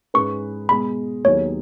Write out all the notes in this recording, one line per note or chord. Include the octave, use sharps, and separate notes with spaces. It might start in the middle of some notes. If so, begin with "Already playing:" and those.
G#2 G#3 C#4 B4 C#6
B2 G#3 B3 B5
D#2 D#3 F#3 B3 G#4 C#5